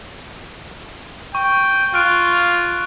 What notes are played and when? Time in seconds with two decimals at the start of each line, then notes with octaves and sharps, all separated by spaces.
1.35 G5 C#6
1.94 F4 F6 F#6 D7